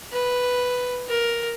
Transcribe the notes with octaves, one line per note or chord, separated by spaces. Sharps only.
B4
A#4